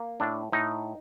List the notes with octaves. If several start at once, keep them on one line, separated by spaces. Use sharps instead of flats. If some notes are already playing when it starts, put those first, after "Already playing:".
Already playing: A#3
A2 D4
A2 D#4